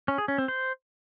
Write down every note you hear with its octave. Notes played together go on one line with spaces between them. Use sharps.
C#4
G#4
C#4
C4
C5